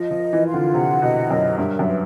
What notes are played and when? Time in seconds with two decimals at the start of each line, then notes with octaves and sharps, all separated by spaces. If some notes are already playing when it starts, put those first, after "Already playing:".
Already playing: F3 D#5
0.11 F3
0.18 A#4
0.33 E3
0.46 F4
0.54 D3
0.74 C3 F#5
1.02 B2 D#5
1.31 F#2 A#4
1.57 G2 E5
1.79 F#2
1.86 B4